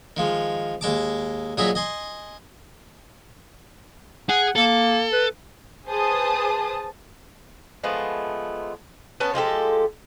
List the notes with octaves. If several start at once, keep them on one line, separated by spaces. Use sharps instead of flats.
D#3 F3 G#3
D#2 G#3 A5 D6
A#1 F#3 G#4 D#5 E5 B5
D#5 G#5 C6
G#4 F#5
A#3 A4
B4
G#4 B4 C5 A5 D#6
F3 G#3 A3 B3
B3 C#4 A5
F3 G#3 G4 A4